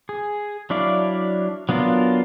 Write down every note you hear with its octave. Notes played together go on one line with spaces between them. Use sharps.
G#4
F#3 D4 E4 D5 F5
F#3 B3 D4 F4 A#4